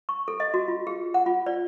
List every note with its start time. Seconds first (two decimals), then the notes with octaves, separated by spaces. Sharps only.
0.09 C#6
0.28 A4
0.40 D#5
0.54 F#4
0.68 F4
0.87 G#4
1.14 F#5
1.26 F4
1.46 D5